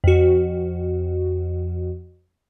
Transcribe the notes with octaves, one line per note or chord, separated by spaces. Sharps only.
F2 F#4